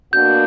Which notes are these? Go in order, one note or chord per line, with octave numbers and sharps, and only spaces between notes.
B2 A#3 D4 F#4 G6